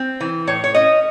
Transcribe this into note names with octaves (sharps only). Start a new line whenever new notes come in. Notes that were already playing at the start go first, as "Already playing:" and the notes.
Already playing: C4
E3
A2 C#5
C#5
C#4 D#5